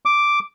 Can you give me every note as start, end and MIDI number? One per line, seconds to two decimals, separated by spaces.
0.05 0.39 86